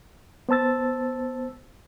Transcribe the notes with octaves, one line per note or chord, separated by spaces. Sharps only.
B3 C5 A5 E6 A6